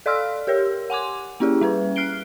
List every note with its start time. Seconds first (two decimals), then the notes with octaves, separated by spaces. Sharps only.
0.06 A4 D5 F5 C6 E6 F6
0.47 G4 A#4 C#5
0.90 F#5 G#5 C6 D6
1.40 A#3 C#4 E4 G4 G#4
1.61 G3 C#4 B4
1.96 F6 F#6 C7 D7 G7